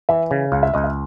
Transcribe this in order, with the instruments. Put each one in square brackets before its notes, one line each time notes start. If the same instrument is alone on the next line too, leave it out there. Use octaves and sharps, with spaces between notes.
[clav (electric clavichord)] E3 [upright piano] E5
[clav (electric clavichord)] C#3
[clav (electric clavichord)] C#2 [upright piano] F5
[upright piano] E5
[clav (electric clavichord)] C#2 [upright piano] D#5
[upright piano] E5